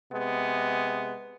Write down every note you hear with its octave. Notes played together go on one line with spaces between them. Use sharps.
C3 G#3 B3